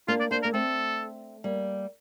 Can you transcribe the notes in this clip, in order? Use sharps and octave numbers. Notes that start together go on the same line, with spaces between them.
A#3 D4 F4
D5
A#3 D4 C5
A#3 A#4
A3 C4 A4
G3 A#3